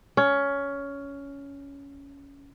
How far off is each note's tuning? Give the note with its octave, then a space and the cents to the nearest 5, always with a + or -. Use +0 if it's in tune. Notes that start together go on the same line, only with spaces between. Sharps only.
C#4 +15